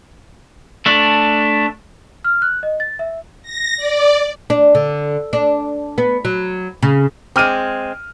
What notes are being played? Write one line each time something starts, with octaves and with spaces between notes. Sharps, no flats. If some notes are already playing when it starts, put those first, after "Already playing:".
A3 D4
F6
F#6
D#5
A6
E5
A#6
D5
D4
D3
D4
B3
F#3
C#3
G#3 C4 D6 F6 D#7